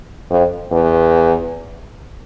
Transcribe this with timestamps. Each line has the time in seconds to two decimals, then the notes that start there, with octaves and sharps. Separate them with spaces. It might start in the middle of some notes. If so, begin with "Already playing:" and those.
0.31 F2
0.71 E2